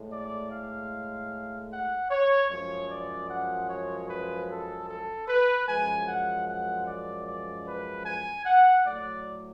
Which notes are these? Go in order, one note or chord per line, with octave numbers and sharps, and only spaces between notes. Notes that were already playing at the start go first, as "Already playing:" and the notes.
Already playing: A2 G#3
D5
F5
F#5
C#5
F#2 F3 G#3 C#5
D5
F#5
C#5
B4
A4
A4
B4
F#2 F3 G#3 G#5
F#5
F#5
D5
D5
B4
G#5
F#5
A2 F#3 D5